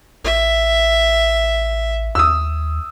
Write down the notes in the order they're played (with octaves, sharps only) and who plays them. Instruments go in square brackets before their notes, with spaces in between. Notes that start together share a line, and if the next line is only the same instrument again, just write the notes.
[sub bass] A1 [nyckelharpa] E5
[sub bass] D#2 [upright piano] D#6 E6